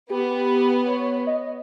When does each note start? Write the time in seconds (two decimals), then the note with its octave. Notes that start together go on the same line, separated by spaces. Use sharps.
0.10 B3 G4
0.86 C#5
1.27 D#5